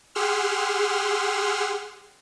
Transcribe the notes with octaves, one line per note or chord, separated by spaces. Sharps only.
G4 G#4 F#5 C6 E6 F6